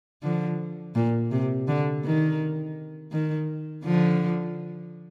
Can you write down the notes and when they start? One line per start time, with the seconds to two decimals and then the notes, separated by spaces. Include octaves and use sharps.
0.23 D3 F3
0.95 A#2
1.31 C3
1.68 D3
2.04 D#3
3.12 D#3
3.84 D3 F3